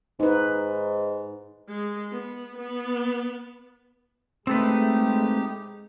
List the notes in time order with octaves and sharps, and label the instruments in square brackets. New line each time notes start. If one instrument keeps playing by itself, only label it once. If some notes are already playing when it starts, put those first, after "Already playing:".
[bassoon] G#2 [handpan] D#4 B4
[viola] G#3
B3
B3
[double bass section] G#3 [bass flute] A3 [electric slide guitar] C4 A4 B4 [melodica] D#4 G4